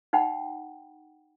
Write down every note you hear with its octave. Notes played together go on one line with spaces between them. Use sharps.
D#4 F#5 G5 B5